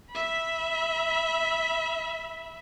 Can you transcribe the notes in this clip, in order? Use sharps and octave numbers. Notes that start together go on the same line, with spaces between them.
E5 B5